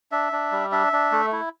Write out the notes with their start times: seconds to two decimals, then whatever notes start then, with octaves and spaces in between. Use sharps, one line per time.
0.12 D4 E5
0.32 D4
0.52 G3
0.72 D4 E5
0.93 D4
1.12 A3
1.32 E4